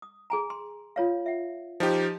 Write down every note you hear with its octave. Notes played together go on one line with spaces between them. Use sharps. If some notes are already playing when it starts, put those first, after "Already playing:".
D#6
G#4 G#5 A#5
C6
F4 C#5 F5
E5 F#5
F3 D#4 G4